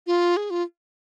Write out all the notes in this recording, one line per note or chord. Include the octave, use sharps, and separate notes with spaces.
F4
G#4
F4